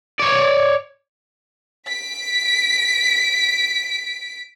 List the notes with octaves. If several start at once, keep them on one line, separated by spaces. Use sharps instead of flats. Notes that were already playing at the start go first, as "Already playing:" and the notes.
C#5 D5
B6 D7